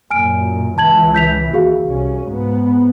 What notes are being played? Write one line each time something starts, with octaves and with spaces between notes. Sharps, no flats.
F#2 A#2 G#5 F6 D7
C#2 E3 A5 G#6 F#7
G6 B6 F7
D#2 F#4 G#4 F5
C2 C#4
G#2 B3